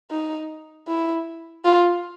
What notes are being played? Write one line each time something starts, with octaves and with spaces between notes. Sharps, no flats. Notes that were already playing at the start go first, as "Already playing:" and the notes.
D#4
E4
F4